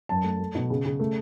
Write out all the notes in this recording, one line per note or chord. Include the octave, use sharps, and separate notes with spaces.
F#2 A5
A3
A3
B2
C#3
C#3
A3